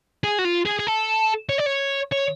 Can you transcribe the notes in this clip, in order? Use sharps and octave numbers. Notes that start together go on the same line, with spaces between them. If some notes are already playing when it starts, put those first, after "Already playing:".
G#4
F#4
F4
G#4
G#4
A4
C#5
D5
C#5
C#5